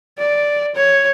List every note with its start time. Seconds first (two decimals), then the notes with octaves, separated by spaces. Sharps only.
0.18 D5
0.75 C#5